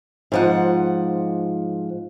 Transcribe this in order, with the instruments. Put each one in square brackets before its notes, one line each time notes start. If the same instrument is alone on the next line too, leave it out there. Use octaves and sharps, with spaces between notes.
[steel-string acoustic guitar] G#2 F3 F#5